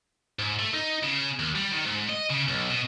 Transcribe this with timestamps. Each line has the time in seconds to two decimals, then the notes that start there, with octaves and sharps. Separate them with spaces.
0.39 G#2
0.59 A3
0.74 D#4
1.03 C#3
1.39 D#2
1.56 G3
1.72 D#3
1.86 G#2
2.09 D#5
2.30 C#3
2.48 B1
2.70 B2